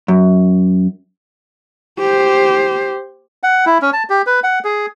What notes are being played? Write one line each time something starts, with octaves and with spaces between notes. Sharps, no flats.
F#2
G4 C5
F#5
E4
C#4
A5
G4
B4
F#5
G#4